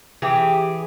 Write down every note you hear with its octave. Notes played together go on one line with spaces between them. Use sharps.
E3 G4 G#4